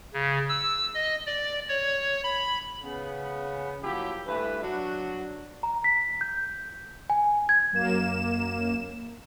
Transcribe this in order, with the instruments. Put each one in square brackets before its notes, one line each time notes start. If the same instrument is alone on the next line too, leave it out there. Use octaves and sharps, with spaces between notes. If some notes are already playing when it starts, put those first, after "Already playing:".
[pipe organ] C#3
E6
D#5
D5
C#5
B5
[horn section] C#3 B3
F3 F#3 A#3 E4 G4
G2 E3 A3 B4
F#3 D4 F#4
[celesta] A#5
B6
G6
G#5
G#6
[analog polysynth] F#2 A#3 E7